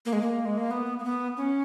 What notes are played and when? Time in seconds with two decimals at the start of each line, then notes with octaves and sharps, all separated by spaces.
0.05 A#3
0.13 G#3
0.21 A#3
0.45 G#3
0.57 A#3
0.71 B3
0.99 A#3
1.04 B3
1.37 C#4